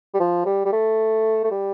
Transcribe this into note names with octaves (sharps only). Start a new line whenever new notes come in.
G3
F3
G3
G3
A3
A3
G3